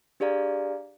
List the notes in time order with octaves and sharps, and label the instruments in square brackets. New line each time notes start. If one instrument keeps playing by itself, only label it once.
[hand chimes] D4 G4 G#4 D5 F5 A#5